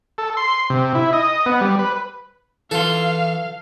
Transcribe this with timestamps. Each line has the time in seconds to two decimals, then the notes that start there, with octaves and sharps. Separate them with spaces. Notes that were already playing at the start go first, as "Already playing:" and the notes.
0.18 A4
0.37 C6
0.70 C3
0.95 E4
1.13 D#5
1.46 B3
1.61 G3
1.79 B4
2.71 E3 F4 A4 F5